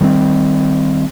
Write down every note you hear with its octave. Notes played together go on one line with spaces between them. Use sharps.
D#3 G3 G#3 C4